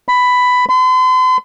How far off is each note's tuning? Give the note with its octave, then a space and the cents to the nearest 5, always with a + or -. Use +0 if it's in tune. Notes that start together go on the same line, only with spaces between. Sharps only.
B5 +10
C6 -45